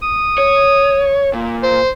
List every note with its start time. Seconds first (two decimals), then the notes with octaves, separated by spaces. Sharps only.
0.02 D#6
0.38 C#5
1.33 A#2
1.63 C5